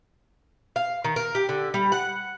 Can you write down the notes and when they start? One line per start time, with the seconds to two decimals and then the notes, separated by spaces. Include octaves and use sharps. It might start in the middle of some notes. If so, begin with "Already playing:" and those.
0.76 F5
1.04 D#3
1.16 A#4
1.35 G4
1.49 D3
1.74 G3
1.92 F#5